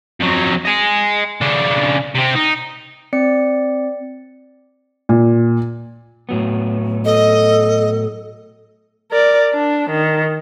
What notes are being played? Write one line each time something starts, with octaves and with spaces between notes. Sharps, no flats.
F2 F#3
D#5 G#5
C#3 D4
C3 C4
D#4
C4 D5 C#7
A#2
A2 F#3 B3
A4 D#5
A#4 D5
D4
D#3